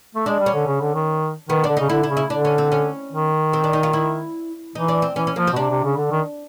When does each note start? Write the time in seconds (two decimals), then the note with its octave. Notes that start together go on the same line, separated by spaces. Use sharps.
0.15 A3
0.26 G#3 D4
0.40 G3
0.46 C#4
0.54 D3
0.67 C#3
0.81 D3
0.94 D#3
1.49 D#3 B3
1.64 D4
1.69 D3
1.77 C#3 D#4
1.89 D3 E4
2.03 E4
2.10 C#3
2.17 E4
2.30 D3 D4
2.45 C#4
2.58 C4
2.72 C#4
3.12 D#3
3.53 C4
3.64 D4
3.73 D#4
3.83 F4
3.93 E4
4.75 E3 D#4
4.88 D4
5.02 C4
5.16 E3 C#4
5.27 C#4
5.36 F3 A#3
5.47 C4
5.52 B2
5.56 C3 D4
5.70 C3
5.84 C#3
5.97 D3
6.11 D#3